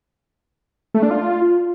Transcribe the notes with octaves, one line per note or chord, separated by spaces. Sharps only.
A3
D4
F4